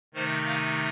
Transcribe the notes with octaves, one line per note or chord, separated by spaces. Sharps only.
C3 D#3 A3 D#4 C5
F5